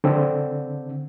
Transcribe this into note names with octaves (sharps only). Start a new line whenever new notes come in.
D3 C4